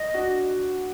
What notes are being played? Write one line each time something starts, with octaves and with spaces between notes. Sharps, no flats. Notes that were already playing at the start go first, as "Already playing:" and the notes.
Already playing: D#5
D4 F#4